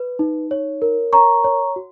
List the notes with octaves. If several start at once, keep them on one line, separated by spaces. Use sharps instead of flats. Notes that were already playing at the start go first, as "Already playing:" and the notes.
Already playing: B4
D#4
C#5
A#4
C#5 A#5 C#6
C#5
F#4